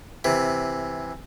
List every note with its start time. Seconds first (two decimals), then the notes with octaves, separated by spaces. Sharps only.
0.24 C3 E3